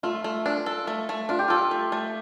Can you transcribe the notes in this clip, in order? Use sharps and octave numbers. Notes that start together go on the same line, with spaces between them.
A3 F4
A3
D4
A4
A3
A3
D4 F4
G4
F4 A4
A3
A3